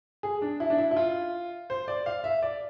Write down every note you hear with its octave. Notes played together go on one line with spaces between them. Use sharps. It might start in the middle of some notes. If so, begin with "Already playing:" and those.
G#4
D4
E4
D4
E4
E4
F4
C5
D5
F5
E5
D5